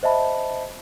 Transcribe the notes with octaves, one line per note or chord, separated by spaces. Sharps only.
C5 D#5 E5 A5 B5